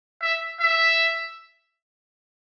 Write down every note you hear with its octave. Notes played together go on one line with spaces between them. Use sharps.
E5
E5